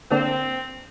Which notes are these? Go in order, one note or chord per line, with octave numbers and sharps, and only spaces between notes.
D3 A#3 C4 D4